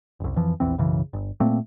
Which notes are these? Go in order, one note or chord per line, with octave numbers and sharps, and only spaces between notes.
F#1 C2
F2 E3 F3
A#1 E2 E3 C4
B1 F#2 C#3 E3
G1
A#2 A3 A#3 C4